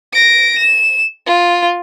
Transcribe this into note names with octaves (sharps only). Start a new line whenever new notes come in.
A#6 D7
E7
F4